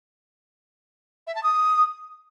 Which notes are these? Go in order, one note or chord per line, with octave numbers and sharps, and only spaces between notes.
E5
A5
D#6